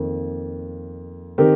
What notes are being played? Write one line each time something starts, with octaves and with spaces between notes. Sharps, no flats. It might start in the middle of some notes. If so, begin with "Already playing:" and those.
Already playing: F2 D#3 A#3
D#3 C4 G4 A#4